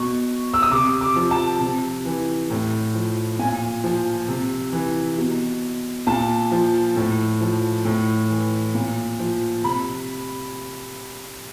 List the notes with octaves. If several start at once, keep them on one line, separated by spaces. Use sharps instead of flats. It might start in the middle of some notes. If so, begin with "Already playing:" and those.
Already playing: B2 C#6
E6
D#6
C3 D6
D6
F3
A5
C3
E3
A2
F3
A#2 G#5
F3
C3
E3
B2
A#2 A5
F3
A2
F3
A2
E3
A#2
F3
C3 B5